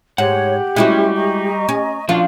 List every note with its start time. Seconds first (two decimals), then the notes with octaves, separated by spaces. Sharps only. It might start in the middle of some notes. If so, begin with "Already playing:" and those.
0.18 G#2 G4 C#5 F#5
0.76 G3 G#3 C#4 E4 F#4
1.16 D#5 A#5 C#6
1.69 C#4
2.09 F3 C#4 D4 F4 F#4 F5 C#6